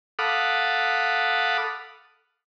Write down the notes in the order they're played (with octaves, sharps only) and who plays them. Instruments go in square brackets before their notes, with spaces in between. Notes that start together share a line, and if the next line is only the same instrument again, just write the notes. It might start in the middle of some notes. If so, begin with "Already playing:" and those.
[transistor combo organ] A4 F5 F#5 B5 D6 D#6